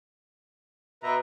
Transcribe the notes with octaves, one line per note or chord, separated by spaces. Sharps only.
B2 B4 E5 A#5